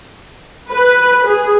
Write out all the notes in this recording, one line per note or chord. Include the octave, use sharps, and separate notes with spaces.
B4
G#4